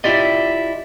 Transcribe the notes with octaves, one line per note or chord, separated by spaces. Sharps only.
E4 F4 G4 D5 D#5